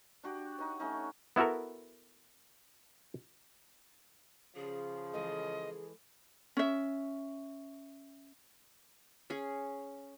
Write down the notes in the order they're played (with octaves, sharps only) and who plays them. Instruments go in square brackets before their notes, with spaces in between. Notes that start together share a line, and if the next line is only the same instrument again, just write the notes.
[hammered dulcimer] D4 F#4 G4
D#4 C#5
A3 C#4 D#4
[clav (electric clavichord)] B3 E4 F#4 A4 A#4
[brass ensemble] C#3 F3 [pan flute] G#4
[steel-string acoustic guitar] E3 G#3 A4 [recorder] D#5
[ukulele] C#4 E5
[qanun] C#4 G#4